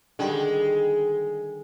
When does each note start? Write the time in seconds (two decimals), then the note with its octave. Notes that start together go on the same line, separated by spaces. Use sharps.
0.19 D3 D#3 G3 G#3